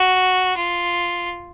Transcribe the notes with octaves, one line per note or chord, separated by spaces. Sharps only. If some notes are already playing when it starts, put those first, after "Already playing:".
Already playing: F#4
F4